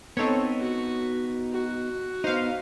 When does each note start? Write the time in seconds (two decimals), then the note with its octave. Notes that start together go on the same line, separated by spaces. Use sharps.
0.17 B3 C4 D#4 A4 C#5
0.59 F#4
1.52 F#4
2.24 B3 D#4 C5 F5